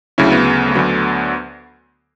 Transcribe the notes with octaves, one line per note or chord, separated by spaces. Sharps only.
D2 C#3 F#3 C#4 E4
B3
A3
D2 D3 F#3 B3